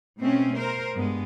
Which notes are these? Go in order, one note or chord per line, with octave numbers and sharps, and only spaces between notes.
B2 A3 C4 C#4
A#4 C5
G2 G#3 B3